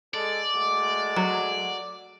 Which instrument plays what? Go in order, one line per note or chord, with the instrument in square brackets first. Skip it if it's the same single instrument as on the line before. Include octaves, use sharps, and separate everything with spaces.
[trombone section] G#3 A4 [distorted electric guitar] D5
[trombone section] G#3 A3 F#4
[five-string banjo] F#3